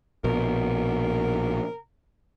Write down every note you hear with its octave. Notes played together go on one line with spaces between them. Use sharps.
A#1 B2 A#4